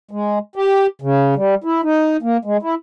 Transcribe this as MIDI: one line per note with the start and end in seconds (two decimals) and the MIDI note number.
0.11 0.39 56
0.56 0.87 67
1.02 1.35 49
1.36 1.55 55
1.64 1.81 64
1.83 2.17 63
2.22 2.37 58
2.45 2.57 56
2.62 2.75 64